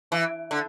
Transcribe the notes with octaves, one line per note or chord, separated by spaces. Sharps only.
E3
D3